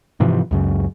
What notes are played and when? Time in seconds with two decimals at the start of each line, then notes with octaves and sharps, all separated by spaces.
0.20 G#2 C3 E3 F3
0.51 C#2 F#2 C#3